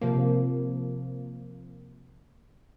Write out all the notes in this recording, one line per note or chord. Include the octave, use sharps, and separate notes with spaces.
C3 F3 A#3